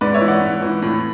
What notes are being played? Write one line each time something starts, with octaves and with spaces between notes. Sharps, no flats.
G#2 B4 D5
C#5 E5
E3
D5 F#5
G#2
E3
A2